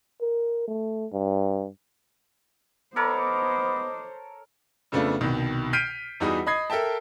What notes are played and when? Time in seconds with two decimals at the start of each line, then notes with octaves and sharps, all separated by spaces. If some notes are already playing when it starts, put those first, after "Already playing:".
0.21 A#4
0.68 A3
1.12 G2
2.96 B3 A4 A#4 C5 C#5 D#5 D6
4.92 F2 C#3 A3 B3 D4 F4
5.21 C2 B2 D#3
5.73 F6 G6 B6 C7 D7 D#7
6.20 E2 G3 D#4 F#4 G#4 D#6
6.46 D#5 B5 D#6 G#6 C7
6.70 A4 A#4 E5 G5 A5